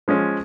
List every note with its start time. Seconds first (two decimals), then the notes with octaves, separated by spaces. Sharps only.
0.08 F3 G#3 C#4